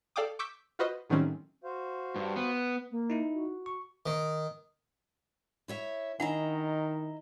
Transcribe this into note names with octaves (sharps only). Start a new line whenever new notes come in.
A4 D5 F5 G5 D6 D#6
C#6 D6 E6 G6 B6 D7
F4 F#4 B4 C5 D#5
A2 D#3 F#3 G3 C4 C#4
F#4 C5 F5
G2
B3
A#3
D#4 E4
F#4
C#6
D#3
E4 C#5 E5
D#3 D4 E4 D#5 F#5 A#5